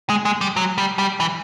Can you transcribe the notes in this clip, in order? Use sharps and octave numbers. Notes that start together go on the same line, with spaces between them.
G#3
G#3
G3
F#3
G3
G3
E3